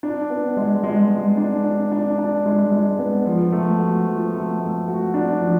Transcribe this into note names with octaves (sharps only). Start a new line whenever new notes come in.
D4
B3
G#3
G#3
G#3
D4
D4
D4
D4
G#3
G#3
B3
F3
A3
F#4
F3
A3
A3
F#4
D4
F3